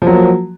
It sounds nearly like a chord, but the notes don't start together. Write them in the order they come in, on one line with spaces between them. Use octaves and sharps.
F3 F#3 A#3